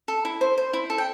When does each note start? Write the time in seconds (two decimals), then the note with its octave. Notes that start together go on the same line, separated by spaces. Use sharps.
0.08 A4
0.25 E4
0.41 C5
0.58 C5
0.73 E4
0.90 A4
0.98 G5